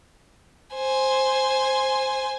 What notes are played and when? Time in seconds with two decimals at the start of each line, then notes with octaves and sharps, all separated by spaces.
0.74 C5 G#5